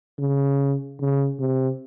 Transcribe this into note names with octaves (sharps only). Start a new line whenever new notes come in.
C#3
C#3
C3